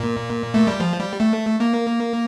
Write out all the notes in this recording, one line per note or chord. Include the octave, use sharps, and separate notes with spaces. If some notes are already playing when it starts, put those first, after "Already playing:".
Already playing: A#2
A3
G3
F3
G3
A3
A#3